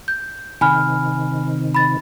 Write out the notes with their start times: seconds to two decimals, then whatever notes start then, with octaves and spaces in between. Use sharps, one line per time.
0.08 G6
0.61 C3 D#3 G#5 B5 F6
1.75 B5 A6